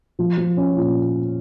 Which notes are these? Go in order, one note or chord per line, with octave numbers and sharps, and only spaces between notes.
F3
F3
C#4
A#2